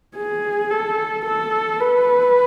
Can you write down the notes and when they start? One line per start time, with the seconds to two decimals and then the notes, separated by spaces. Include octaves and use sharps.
0.16 G#4
0.71 A4
1.26 A4
1.81 B4